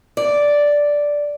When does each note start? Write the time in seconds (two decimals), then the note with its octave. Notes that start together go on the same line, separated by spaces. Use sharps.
0.17 D5